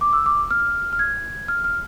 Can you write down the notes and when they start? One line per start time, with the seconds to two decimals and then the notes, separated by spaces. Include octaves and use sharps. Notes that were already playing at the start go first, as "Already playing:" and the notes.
0.01 D6
0.13 E6
0.26 D6
0.51 F6
0.93 F6
0.99 G#6
1.48 F6
1.64 F6